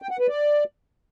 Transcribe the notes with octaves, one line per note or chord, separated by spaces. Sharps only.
G5
F#5
B4
D5